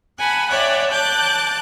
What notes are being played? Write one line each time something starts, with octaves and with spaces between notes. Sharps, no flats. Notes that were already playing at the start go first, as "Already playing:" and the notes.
F#5 G#5 A5 B5
C#5 D5 E5 F#5 G5
A5 D6 F#6 G6